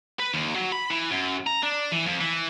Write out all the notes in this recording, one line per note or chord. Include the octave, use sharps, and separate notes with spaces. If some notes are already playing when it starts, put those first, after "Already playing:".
B4
D#2
F#3
B5
E3
F#2
A#5
D4
E3
F2
E3